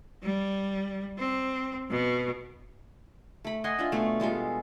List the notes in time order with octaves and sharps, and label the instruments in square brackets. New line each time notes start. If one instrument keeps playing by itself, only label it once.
[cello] G3
C4
B2
[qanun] A3 B5
D#5 F#5 G#5 C6
D4 F4 E5
B2 A3
G3 G#3 F4 A4